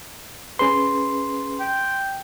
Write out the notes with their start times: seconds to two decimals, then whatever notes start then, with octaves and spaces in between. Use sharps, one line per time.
0.59 C#4 G#4 B4 C6
1.60 G5